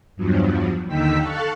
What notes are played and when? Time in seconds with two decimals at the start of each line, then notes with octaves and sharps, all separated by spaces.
0.16 E2 G2 F3 F#3
0.86 D#2 D3 D#4 G5 E6 B6
1.21 A4 F5 A5 C#6 F#6